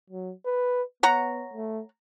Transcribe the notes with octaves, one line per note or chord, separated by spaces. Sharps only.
F#3
B4
B3 C#5 F#5 A#5
A3